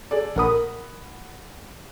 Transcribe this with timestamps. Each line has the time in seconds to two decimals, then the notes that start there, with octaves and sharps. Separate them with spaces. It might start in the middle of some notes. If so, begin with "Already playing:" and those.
0.11 G#4 A4 D5
0.36 A#1 A#4 F#5 B5 D#6